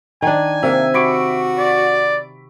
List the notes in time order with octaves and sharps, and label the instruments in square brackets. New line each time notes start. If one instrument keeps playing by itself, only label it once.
[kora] D#3 D4 [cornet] G#5
[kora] C3 [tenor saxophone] A#3 [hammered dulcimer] E5
[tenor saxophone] F#4 [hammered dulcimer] B5 C#6 D6
[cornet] D5